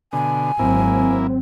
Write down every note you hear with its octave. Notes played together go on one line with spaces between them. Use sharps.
B2 D3 G#5
G#1 F#3 A#3 C4 E4